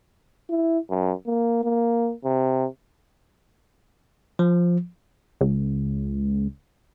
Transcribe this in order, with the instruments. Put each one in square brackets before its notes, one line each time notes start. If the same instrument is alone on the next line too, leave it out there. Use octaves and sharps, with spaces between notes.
[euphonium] E4
F#2
A#3
A#3
C3
[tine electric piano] F3
[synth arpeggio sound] C#2